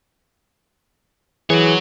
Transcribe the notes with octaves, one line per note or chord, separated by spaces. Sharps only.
E3 F#4 G#4 C#5